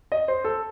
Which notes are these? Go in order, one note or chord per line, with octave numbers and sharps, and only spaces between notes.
D#5
C5
A4